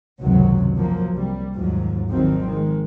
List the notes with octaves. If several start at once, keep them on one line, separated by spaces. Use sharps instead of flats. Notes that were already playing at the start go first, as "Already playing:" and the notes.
G#1 C#2 F#2 C3 D#3 F#3
F3 F#3 A#3
C2 G3
D#2 G#2 F3 F#3
G#1 D#3 F3 F#3 C4
D#3 F3 G#3